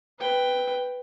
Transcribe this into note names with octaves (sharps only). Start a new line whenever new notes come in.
B4 G5